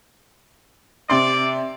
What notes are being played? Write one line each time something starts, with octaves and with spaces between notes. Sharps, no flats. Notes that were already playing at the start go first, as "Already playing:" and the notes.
C3 D5 C6